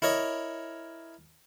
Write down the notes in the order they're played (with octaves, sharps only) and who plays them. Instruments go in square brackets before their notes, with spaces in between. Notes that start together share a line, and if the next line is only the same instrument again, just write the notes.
[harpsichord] E4 A#4 C#5 D#5